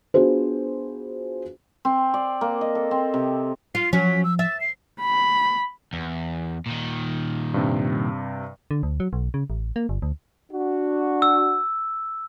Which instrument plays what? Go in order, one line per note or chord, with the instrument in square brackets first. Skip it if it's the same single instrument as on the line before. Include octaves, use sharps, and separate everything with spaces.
[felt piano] B3 D4 F4 F#4 G#4 C5
[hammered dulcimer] C4
D5
A#3
D#5
A4
C4
C3
[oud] F4 [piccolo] C7
[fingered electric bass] F3 [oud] F#3 C#4 [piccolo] B6
[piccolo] E6
[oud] E5 [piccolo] A6
[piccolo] C7
[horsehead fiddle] B5
[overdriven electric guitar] E2
A#2 D#3
[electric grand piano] G2 C3
[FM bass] D3
D2
F#3
B1
C#3
A1
A#3
G1
D2
[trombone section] D4 F#4
[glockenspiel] E6